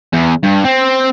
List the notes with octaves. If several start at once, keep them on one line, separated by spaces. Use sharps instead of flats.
E2
G2
C4